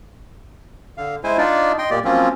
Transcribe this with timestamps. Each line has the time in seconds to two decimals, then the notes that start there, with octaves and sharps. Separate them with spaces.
0.97 D3 F5
1.24 G#3 E4 C5 G#5
1.38 D4 D#4 F4 D5
1.78 D#5 G5 C6
1.90 A#2 A#3 G4 D5
2.05 F3 F#3 A#3 C4 C#4 F4